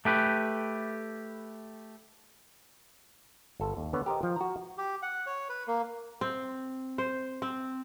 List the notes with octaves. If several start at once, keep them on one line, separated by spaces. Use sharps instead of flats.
A3 G4 B4
G1 A4
D#2
D3 B3 B4 C#5
G4 A#4 C5 D#5
F3
F#4 A#5
G4
F#5
C#5
B4
A#3
C4
C5
C4